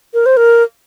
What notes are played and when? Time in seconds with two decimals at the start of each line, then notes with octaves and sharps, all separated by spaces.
0.14 A#4
0.26 C5
0.37 A#4